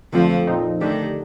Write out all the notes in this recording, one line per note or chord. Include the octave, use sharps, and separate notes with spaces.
F2 D3 F3 A3 C4 F4
A#2 F3 C4 D#4
D3 D#3 A3 D4 G4